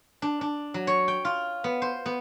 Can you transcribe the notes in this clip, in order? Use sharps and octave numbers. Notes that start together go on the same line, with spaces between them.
D4
D4
F#3
C#5
G5
F4
B3
C5
B3